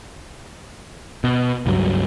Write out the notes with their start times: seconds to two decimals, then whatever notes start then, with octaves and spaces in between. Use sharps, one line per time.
1.24 B2
1.66 C#2 G2 F#3